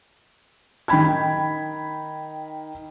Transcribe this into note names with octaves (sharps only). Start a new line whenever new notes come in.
D#3 G5 B5 G#6